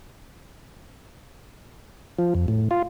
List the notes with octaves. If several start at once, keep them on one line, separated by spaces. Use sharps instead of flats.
F3
F2
A2
F4